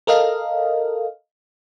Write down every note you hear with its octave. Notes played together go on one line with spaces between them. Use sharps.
A4 A#4 D#5 F5